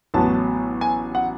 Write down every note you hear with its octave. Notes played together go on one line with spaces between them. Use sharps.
A1 A2 F#3 B3 A5
G#5
F#5